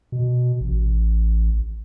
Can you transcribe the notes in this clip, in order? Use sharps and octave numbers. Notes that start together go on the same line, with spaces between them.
B2
A1